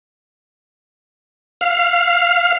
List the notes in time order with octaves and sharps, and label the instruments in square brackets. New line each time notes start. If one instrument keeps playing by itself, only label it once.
[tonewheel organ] F5